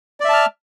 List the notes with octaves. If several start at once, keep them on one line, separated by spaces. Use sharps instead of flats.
D5 E5 A5 F6